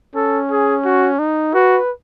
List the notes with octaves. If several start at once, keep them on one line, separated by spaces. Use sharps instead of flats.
C#4 A4
G#4
F#4
D#4
F#4 B4